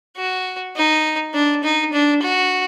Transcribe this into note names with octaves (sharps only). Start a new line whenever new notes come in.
F#4
D#4
D4
D#4
D4
F#4